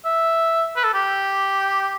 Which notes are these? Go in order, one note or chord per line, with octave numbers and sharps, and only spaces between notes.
E5
B4
A4
G4